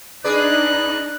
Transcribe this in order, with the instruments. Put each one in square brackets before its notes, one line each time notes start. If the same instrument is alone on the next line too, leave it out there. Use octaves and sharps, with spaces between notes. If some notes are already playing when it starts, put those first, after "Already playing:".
[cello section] D4 D#4 [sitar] G#4 B4 D5 [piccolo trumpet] F#6